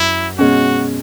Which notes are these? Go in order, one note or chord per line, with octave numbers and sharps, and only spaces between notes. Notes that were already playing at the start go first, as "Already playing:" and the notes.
Already playing: F#2 F#3 E4
B2 G#3 C#4 F#4